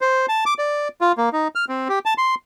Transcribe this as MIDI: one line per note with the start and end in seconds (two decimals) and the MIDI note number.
0.01 0.26 72
0.29 0.44 81
0.46 0.54 86
0.59 0.88 74
1.01 1.12 65
1.18 1.29 58
1.33 1.48 63
1.55 1.65 89
1.69 1.88 60
1.89 1.99 67
2.05 2.14 81
2.18 2.35 84